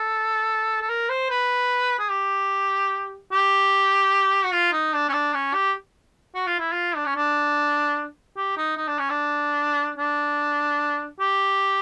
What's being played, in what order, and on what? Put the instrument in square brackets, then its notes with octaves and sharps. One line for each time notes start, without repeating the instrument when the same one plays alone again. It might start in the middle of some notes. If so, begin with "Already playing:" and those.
Already playing: [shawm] A4
A4
A#4
C5
B4
G#4
G4
G4
F#4
F4
D#4
D4
C#4
D4
C#4
G4
F#4
F4
E4
F4
D4
C#4
D4
G4
D#4
D#4
D4
C#4
D4
D4
G4